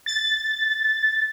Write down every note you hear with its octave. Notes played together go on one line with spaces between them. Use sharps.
A6